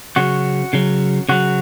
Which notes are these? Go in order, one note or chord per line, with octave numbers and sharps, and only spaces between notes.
C#3 F#3 F#4
C#3 F#3
C#3 F#3 F#4